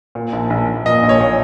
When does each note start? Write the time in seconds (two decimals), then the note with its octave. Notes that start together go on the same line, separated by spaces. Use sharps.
0.15 A#2
0.33 A#1
0.50 A#1
0.68 A#1
0.86 A#2 D#5
1.03 A#1
1.09 C#5
1.20 A#2